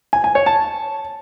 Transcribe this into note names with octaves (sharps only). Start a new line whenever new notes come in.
G#5
G#5
C#5
A5